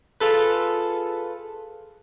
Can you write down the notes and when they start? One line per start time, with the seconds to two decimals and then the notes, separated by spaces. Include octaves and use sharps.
0.20 F4 G#4 A4 B4